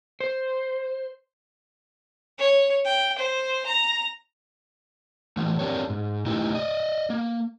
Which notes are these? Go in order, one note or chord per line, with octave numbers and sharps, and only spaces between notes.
C5
C#5
G5
C5
A#5
E3 F3 A3
C4 D4 E4 G4 A#4 C#5
G#2
C3 A3 D#4 E4 G4
D5 D#5
A#3